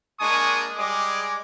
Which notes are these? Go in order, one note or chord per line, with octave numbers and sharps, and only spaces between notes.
G#3 A#3 D4 G#5 C#6 D#6
G3 G#3 G#4 D6